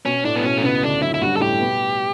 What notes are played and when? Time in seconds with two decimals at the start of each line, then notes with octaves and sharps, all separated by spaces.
0.05 B2 C#4
0.25 A2 D4
0.36 B3
0.44 B2 C#4
0.58 A3
0.63 C#2 C#3 B3
0.82 D2 D3 D4
1.02 F#2 F#3 E4
1.14 E4
1.21 G2 G3 F#4
1.37 A4
1.41 A2 A3 G4
1.60 B2 B3